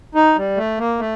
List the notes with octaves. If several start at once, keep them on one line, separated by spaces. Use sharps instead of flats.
D#4
G3
A3
A#3
A3